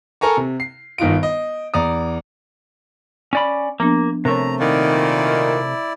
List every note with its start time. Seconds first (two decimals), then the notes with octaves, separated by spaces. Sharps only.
0.21 A4 A#4 G#5 A#5 C#6
0.37 C3
0.60 C7
0.98 G1 D#3 D#4 F4 D7
1.23 D#5
1.74 E2 D5 A#5 D#6
3.33 C#4 D5 B5
3.80 F3 A#3 B3 D4
4.25 C3 A3 A#4 C#5 A#5
4.60 A#2 D#3 E4 D5